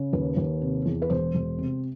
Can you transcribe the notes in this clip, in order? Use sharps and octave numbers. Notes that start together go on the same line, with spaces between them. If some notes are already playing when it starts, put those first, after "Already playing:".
Already playing: C#3
D#2 B4
D#2
C3
E2
B4
E1 C5
E1
C3